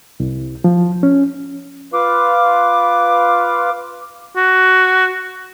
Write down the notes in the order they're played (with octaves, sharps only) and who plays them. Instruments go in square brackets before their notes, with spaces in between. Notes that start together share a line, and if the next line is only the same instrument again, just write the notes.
[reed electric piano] C2
F3
C#4
[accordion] F4 B4 F5 [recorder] D6
[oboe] F#4